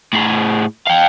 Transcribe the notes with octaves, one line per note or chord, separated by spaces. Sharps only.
A2 G#4
F5 G5